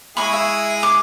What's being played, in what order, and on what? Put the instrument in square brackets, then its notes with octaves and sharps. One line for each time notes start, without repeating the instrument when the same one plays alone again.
[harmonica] G#3 E4 G#4 [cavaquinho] B5 C#6
[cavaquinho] E5
D6